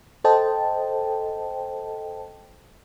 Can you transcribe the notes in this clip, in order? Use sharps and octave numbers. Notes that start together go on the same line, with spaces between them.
A4 C5 D#5 G5 A5